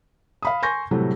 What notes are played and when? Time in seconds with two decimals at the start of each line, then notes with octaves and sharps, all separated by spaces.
0.42 F5 B5 D#6
0.63 G#5 C6 C#6 G6 A#6
0.91 A2 C3 E3 F#3 G3 A3